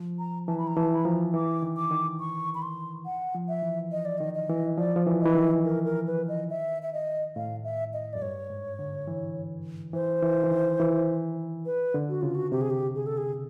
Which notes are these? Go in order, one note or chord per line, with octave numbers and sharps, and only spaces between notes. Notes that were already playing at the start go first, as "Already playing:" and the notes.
Already playing: F3
A#5
E3 A5
B5
A#5
E3 A5
B5
F3 A#5
E3 D6
D#3
D6
D#3
C#6
B5
C6
F#5
F3
E5
E3
D#5
D5
D#3 D#5
D#5
E3
F3 D5
F3
E3
D#5
E3
D#3
A#4
A#4
B4
D#5
E5
E5
D#5
A2 F5
E5
D#5
F#2 D5
G2 C#5
G#2
D3
E3
E3 C5
E3
E3
D#3
E3
B4
D3
F#4
C#3 F4
F#4
C3 G4
G#4
G4
G#4
A4
G#4